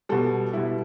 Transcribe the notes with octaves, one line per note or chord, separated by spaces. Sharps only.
B2 G3 A4
B2 G3 E4